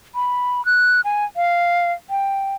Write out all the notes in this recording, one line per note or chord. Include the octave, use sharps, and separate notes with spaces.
B5
F#6
G#5
F5
G5